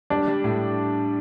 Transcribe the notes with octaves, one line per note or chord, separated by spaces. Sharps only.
G3 D4
G3
A2